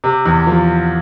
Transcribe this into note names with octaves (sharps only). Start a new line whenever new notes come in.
C3
E2
F3